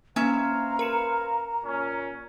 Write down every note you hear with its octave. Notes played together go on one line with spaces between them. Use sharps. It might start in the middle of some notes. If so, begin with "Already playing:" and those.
A#3 C#4 B4 C5 E5 F5 A#5
A#4 C#7 E7
A#2 C#4